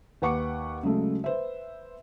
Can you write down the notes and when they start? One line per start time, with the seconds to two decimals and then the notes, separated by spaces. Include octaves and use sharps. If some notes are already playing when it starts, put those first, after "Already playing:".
0.22 D#2 B4 F#5 C#6 D6 C#7
0.83 C#3 F#3 G#3 A3
1.24 B4 C5 E5